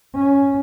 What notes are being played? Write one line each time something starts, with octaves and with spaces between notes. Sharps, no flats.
C#4